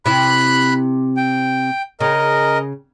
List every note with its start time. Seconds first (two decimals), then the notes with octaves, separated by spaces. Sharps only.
0.06 C3 E4 B5 F#6
1.17 G5
2.01 C#3 A#4 D#5